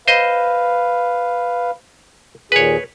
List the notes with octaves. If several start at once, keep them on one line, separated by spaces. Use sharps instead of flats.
B4 C5 D#5 F5
D#2 A#2 G#4 B4 C#5